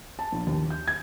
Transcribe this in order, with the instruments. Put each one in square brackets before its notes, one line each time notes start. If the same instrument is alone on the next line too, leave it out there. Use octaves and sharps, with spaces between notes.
[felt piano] A5
A#1
D#2
G6
G#6